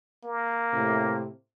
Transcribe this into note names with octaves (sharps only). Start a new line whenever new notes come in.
A#3
A2 C3